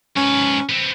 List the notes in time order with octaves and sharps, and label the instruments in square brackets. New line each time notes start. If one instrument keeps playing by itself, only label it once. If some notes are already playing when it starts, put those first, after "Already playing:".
[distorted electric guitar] G#2 B4 [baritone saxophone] C#4
[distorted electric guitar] B3 C4